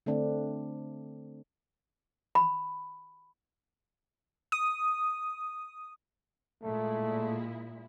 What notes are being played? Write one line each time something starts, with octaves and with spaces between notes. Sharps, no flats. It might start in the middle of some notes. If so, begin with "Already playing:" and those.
D3 A3 C4 D4
B5
D#6
A#2 G#3 A3 E4